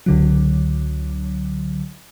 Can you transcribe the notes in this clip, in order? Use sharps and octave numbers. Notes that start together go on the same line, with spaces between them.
C#2 D3 F#3